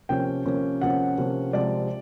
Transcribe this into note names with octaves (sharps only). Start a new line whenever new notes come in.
C3 F3 A#3 C#4 G5
C3 F3 A#3 C#4
C3 F3 A#3 C#4 F#5
C3 F3 A#3 C#4
C3 F3 G#3 D5